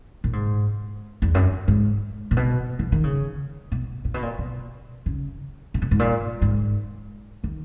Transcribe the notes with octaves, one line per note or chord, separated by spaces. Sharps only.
A#2
G#2
E2
F#2
G#2
A#2
B2
E3
D#3
C#3
B2
A#2
B2
A#2
B2
C#3
B2
A#2
G#2
A#2
G#2
D#3